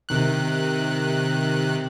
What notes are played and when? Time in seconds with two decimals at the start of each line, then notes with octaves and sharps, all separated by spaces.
0.09 C3 D#3 F#6